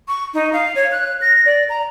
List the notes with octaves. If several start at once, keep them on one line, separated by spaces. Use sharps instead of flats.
C#6
D#4
F5
C#5
F#6
A#6
D5
A#5